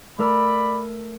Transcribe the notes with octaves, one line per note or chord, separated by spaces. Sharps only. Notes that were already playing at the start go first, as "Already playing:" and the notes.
A3 A#4 D5 B5 E6